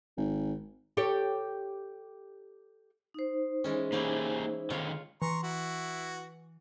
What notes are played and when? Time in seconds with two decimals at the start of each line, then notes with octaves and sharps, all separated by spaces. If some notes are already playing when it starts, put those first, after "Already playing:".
0.17 G#1
0.97 G4 A4 C#5
3.14 D#4 C5
3.64 E3 G#3 C#4
3.92 E3 A#3 C#4 E4 G4 G#4
4.70 D3 D#3 B3 F4 C#5
5.22 E3 A#5 C6 C#6
5.43 E4 F#4